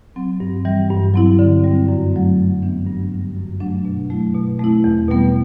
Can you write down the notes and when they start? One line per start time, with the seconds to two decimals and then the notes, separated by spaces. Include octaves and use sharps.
0.16 F#3 C4
0.40 G2
0.65 E3 G3
0.90 G2
1.14 F#3 C4 E4
1.39 D3
1.64 G3 C4
1.88 F#2
2.13 F#3 A3
2.38 F#2
2.62 E3 B3 D4
2.87 G2
3.11 D3 G3
3.36 F#2
3.60 F#3 A3 D4
3.85 B2
4.10 F#3 A3 E4
4.34 B2
4.59 A3 C4 E4
4.84 E2
5.08 B2 G3 B3